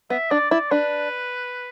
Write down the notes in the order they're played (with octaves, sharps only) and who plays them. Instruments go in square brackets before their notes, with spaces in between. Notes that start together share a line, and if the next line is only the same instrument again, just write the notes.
[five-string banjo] B3 [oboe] E5
[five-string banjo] D4 [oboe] D5
[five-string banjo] E4 [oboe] D5
[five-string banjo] D4 [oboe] B4